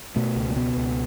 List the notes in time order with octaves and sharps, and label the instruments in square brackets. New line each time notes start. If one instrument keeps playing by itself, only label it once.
[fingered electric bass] B2 A3
C#2
A3
B2 B3
C#2